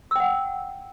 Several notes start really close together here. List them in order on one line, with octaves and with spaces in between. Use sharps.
E6 G5 F#5